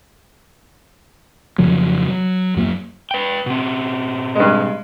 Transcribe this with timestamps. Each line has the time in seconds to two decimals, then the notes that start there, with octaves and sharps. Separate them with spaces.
1.58 F2 C#3 F3 F#3
2.08 F#3
2.56 F#2 F#3 A#3
3.11 B4 G5
3.46 B2 C4
4.35 G2 G#3